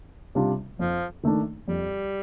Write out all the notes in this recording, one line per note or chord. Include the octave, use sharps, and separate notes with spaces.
C3 G3 D4 F4
F2 F3
D#3 A3 D4
F2 G3